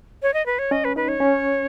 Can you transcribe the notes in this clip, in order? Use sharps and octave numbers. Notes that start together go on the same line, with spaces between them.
C#5
D#5
B4
C#5
C#4 D#5
B4
D#4 B4
C#5
C#4